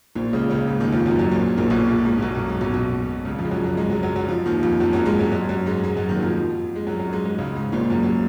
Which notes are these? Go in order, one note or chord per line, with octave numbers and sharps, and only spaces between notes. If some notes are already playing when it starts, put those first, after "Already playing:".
A#1 A#2
C#2 C#3
C#2 C#3
G#2
D#2 D#3
F2 F3
F#2 F#3
F#2 F#3
A#1 A#2
A#1 A#2
B1 B2
A#1 A#2
G#2
A#2
B1 B2
F#2
G#2
B1 B2
B1 B2
C#2 C#3
F2 F3
G#3
F#2 F#3
F#2 F#3
G#2 G#3
F#2 F#3
F#2 F#3
F#2 F#3
F2 F3
D#2 D#3
F2 F3
F#2 F#3
F#2 F#3
G#2 G#3
F#2 F#3
F#2 F#3
F#2 F#3
G#2 G#3
G#2 G#3
F#2 F#3
D#2 D#3
F#3
F2 F3
G#3
F#2 F#3
F#2 F#3
G#2 G#3
G#2 G#3
C#2 C#3
G#2
A#1 A#2
F#2
F#2